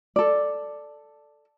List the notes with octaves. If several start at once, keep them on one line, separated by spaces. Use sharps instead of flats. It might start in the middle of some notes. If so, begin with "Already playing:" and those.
A4 D5